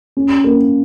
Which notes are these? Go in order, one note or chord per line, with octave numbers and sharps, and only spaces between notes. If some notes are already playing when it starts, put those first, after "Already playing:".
C#4
A#3